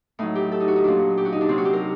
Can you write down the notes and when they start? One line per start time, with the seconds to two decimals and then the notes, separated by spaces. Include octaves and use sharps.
0.19 A2 F#3 D#4
0.35 G4
0.52 A4
0.60 D#4
0.68 F#4
0.76 D#4
0.84 A#2 F#3 D4
1.17 G4
1.25 F#4
1.32 D#4
1.41 D4
1.49 C3 F#3 C4
1.58 F#4
1.65 G4
1.73 A#4